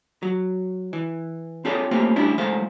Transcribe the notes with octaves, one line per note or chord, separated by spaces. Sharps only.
F#3
E3
C4 F4 G#4 A4 C#5 D5
A3 A#3 C4 C#4 F4 G4
G3 A3 C#4 D4 E4
F3 G#3 A3 C5 F5